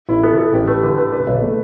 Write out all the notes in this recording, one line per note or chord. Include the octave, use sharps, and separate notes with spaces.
A1 E4
B3 A4
B3 A4
A1 G4
A3 B4
D3 B4
A3 B4
D4 B4
B1
A3